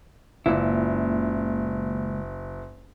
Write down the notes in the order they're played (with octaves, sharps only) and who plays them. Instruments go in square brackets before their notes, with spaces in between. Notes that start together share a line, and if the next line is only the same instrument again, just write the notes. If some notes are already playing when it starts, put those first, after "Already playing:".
[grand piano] F#1 [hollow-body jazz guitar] C#2 A#2 E4